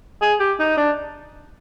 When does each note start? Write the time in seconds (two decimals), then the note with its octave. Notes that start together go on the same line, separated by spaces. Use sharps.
0.21 G#4
0.40 G4
0.59 D#4
0.77 D4